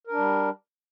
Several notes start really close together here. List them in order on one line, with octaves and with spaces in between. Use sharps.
A#4 D4 G3